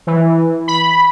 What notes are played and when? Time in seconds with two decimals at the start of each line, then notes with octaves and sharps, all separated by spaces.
0.07 E3
0.68 B5